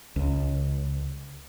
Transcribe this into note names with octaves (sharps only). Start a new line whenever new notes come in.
C#2